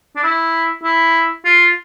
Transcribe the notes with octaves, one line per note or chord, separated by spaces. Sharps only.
D4
E4
E4
F4